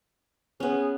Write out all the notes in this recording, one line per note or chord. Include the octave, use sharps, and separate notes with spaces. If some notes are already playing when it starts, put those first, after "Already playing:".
B3 C#4 G#4